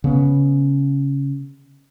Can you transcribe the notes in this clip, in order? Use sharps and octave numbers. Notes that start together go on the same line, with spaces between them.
C#3 B3